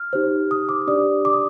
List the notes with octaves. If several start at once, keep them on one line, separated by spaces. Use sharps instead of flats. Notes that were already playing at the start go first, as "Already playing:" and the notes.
Already playing: F6
D#4 G4 C5
D#6
D6
D6
D4 G4 D5 D#6
D6
D#6